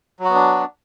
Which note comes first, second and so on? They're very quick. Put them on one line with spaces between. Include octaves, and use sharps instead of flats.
F#3 F#4 B3 D4